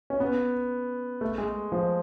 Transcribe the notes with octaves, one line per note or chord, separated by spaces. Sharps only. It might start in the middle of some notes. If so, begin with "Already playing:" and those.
C#4
B3
A3
G#3
F3